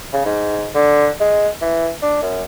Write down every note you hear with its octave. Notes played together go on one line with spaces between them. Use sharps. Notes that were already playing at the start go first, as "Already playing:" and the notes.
C#3
G#2
D3
G#3
E3
D4
F#2